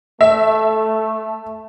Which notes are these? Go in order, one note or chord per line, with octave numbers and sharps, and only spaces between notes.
A3 E5